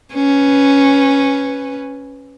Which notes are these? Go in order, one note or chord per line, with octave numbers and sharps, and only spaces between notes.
C#4 B4